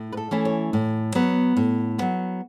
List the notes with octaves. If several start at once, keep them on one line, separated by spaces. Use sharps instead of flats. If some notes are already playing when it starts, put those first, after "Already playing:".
Already playing: A2
B4
A4
E3 A3 C#4 E4
C#5
A2
F#3 B3
A2
F#3 B3